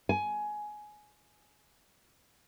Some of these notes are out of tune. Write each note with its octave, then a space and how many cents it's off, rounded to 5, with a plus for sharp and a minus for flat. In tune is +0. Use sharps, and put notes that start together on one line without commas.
G#5 +15